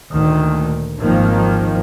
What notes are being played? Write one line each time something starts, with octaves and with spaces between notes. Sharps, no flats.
D2 A#2 D#3
G#1 D#3 F3 A#3